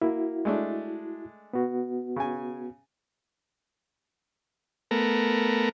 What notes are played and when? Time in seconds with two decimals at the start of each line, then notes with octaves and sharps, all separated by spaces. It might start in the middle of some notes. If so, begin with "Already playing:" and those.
0.02 A#3 E4 F#4
0.45 G#3 A3 D4
1.53 B3 F#4
2.16 C#3 G#5
4.91 A3 B3 A#4